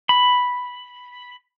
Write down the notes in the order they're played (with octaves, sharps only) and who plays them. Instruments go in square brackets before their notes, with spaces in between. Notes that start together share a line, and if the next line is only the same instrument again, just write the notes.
[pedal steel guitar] B5